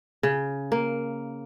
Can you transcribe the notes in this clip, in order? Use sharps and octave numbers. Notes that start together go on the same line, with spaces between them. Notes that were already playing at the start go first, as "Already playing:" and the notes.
C#3
A#3